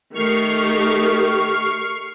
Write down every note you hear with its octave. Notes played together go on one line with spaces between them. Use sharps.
D#3 A3 G4 C#6 F6 C7